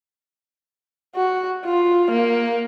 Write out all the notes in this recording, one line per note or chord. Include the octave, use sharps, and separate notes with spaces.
F#4
F4
A#3